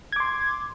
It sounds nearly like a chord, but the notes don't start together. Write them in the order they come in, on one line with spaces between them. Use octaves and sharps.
G#6 D6 C6